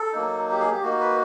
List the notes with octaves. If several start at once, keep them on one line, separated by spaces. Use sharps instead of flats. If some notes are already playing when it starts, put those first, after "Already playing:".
Already playing: A4
F#3 A#3 D#4
G4
G#4
G4
A#3 D#4 F#4
B4